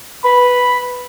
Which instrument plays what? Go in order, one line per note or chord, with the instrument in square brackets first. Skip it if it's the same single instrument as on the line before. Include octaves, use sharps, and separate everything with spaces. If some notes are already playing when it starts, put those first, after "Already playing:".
[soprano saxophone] B4 [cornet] B5